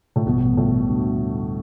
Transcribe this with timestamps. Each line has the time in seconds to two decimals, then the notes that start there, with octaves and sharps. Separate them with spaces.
0.16 A2
0.25 A1 G2 B2 E3 G3
0.57 A2
0.88 D2 D3 G3 D4 F#4